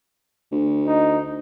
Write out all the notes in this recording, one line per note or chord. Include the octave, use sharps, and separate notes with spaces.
D2
D#4